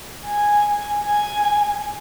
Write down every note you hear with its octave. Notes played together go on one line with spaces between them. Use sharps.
G#5
G#5